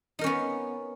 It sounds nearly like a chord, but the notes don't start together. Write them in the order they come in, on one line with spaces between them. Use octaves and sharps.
D#4 A#4 C#4 B3